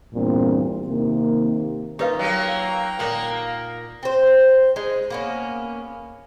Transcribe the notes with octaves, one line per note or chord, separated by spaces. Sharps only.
E2 G2 A#2 C4
C3 D#3 A#3
D#3 A#3 D#4 F4 G4 B4 F5
F#3 A#3 G5 A#5
A#2 A#3 D#4 F#5
C4 C5
G#3 D#4
A#3 B3 C#4